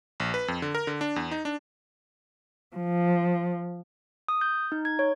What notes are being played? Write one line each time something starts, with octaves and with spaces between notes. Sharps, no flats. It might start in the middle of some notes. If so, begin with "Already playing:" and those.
A#1
B4
F2
D3
A#4
D3
D4
E2
D#4
D4
F3
D#6
G6
D#4
G#6
C#5